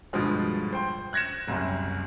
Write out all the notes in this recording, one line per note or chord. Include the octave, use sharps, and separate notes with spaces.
G2 B2 D3 F3 G#3
C5 G5 C6
F#6 G#6 A#6 C#7 E7
F#1 C2 F#2